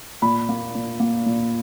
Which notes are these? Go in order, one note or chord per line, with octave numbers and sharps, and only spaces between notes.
A#2 B5
A#3
A#2
A#3
A#2